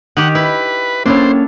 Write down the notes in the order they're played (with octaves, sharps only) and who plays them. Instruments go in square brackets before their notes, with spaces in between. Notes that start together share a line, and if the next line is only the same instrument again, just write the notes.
[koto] D#3 G4 [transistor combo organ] F#5
[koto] E4 [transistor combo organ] B4
[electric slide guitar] A#3 C#5 [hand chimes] C#4 [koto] D4 E4 A4 [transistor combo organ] C5